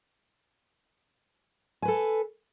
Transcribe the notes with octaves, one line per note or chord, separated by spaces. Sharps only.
A4 B4 G#5